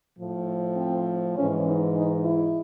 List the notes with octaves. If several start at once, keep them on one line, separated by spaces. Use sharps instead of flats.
A2 F3
C4
G#2 E3 C#4
D#4
D#4
E4